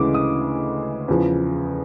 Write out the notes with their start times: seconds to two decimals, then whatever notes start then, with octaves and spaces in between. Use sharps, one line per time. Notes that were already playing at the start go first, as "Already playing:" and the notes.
Already playing: D2 C#3 E3 G#3 D6
0.14 D#6
1.08 E2 C#3 F3